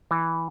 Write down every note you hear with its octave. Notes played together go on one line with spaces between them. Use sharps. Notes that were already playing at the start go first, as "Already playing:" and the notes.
E3